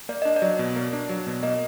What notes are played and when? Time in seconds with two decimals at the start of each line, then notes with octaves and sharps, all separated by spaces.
0.09 A#3 D5
0.22 D4 D#5
0.36 D5
0.42 F#3
0.59 B2
0.76 A#3
0.93 D4
1.09 F#3
1.27 B2
1.43 A#3 D#5